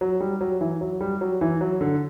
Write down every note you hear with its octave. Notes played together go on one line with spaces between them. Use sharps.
F#3
G3
F#3
E3
F#3
G3
F#3
E3
F#3
D3